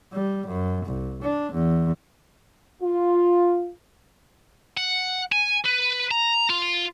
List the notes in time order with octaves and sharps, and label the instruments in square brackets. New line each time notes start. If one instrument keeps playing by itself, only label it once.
[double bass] G3
F#2
C2
D4
E2
[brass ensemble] F4
[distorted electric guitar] F#5
G#5
B4
A#5
F4